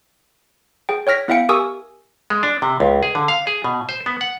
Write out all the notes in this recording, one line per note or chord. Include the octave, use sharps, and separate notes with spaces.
G#4 G5
C#5 G5 F6 A#6 B6
B3 E4 E5 F5 G5 C#7
G4 A#4 G#5 C#6 D#6 E6
G#3
D4
C3
C#2
G#4
D3
F5
G#4
B2
C5
B3
F#5